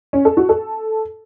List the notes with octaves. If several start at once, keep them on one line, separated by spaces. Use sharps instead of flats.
C#4
A4
F#4
A4